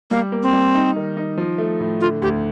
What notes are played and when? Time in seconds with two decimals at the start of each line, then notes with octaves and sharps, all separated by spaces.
0.11 G3 A#3
0.32 A#3
0.43 C4
0.53 G3
0.75 D#4
0.96 D#3
1.17 D#4
1.38 F3
1.58 A3
1.80 A2
2.01 D3 F4
2.22 D2 G4